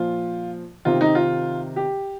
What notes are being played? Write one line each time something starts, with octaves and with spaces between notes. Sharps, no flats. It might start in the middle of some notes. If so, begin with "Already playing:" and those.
Already playing: A#2 F3 F4
C3 D#3 F4
D#4
F4
G4